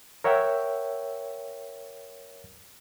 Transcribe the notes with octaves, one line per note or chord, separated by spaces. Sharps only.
A#4 C#5 E5 F#5 G5 E6